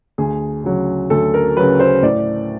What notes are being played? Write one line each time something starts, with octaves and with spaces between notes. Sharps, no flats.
D2 G#4
C#3 F#3
D2 A4
A#4
C#3 F#3 B4
C5
A2 D5